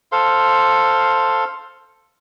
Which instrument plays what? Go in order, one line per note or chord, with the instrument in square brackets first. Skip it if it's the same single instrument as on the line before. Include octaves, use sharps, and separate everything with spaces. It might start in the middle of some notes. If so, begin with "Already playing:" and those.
[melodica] A4 C5 F5 C6